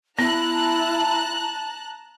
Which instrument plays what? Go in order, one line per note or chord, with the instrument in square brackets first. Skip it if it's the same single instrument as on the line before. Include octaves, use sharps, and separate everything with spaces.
[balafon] B3 [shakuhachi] E4 [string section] A5 A#5 F#6